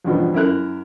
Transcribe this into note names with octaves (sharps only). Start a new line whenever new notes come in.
E2 G2 B2 F3
F#2 E4 A#4 F#6